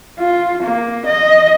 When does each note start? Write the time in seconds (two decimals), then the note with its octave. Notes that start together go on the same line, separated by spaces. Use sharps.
0.19 F4
0.63 A#3
1.06 D#5